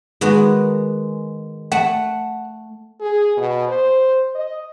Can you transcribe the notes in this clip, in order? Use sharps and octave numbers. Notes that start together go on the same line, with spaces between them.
D#3 G#3 B3 F#4
A3 F#5
G#4
B2
C5
D#5